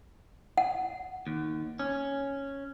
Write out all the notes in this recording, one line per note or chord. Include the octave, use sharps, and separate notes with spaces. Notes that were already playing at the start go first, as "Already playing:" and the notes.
F#5
D#2
C#4